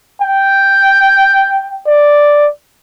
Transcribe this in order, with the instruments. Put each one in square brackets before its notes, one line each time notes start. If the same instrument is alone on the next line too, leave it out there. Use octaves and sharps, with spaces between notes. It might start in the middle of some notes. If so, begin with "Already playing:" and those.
[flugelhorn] G5
D5